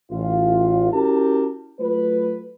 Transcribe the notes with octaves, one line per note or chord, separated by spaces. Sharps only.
A1 F4
C#4 E4 F#4 G4 A#4 A5
F#3 A3 F4 B4